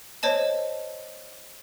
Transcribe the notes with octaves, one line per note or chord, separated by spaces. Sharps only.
C5 C#5 D#5 A5